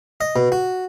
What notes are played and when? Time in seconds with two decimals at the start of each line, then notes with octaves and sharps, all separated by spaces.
0.21 D#5
0.36 B2
0.52 F#4